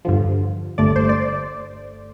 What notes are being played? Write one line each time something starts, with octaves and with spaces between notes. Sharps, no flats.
G2 D3 F3
G1 G2 D3 A3 D5
C5
D5